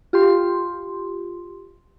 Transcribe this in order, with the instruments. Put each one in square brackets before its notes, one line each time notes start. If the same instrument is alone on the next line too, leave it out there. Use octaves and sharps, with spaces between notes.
[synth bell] F4 G4 C6